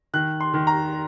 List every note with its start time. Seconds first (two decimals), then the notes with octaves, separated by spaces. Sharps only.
0.13 D#3 F#6
0.41 C6
0.54 D#3
0.67 A#5